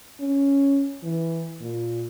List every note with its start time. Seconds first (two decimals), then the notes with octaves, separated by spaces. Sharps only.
0.20 C#4
1.03 E3
1.61 A#2